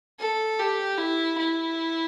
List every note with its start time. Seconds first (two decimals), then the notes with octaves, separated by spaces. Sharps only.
0.19 A4
0.59 G4
0.98 E4
1.38 E4